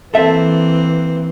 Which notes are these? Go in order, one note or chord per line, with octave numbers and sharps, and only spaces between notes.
E3 A#3 C4 A4 E5